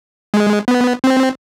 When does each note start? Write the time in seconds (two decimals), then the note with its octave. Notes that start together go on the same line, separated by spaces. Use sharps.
0.34 G#3
0.68 B3
1.04 C4